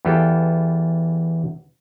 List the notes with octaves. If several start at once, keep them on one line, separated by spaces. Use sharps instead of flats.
E2 E3 F4 G4 A4